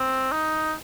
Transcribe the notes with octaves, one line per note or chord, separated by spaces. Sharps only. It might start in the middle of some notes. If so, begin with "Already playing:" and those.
Already playing: C4
D#4